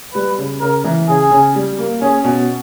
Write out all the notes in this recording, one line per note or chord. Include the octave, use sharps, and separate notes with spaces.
G3 B4
C#3
C#3 A#4
E3
C#3 G#4
C#3
G3
A#3
C#4 G#4
B2